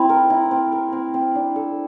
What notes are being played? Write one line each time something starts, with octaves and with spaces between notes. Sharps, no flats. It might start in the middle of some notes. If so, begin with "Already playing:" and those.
Already playing: C4 E4
A#4
E4
C4
A#4
C4
C4
D4
A4